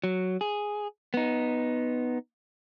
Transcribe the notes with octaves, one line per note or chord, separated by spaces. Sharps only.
F#3
G#4
B3 D#4